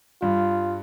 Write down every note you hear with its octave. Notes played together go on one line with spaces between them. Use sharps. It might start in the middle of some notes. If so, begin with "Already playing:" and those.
G2 F4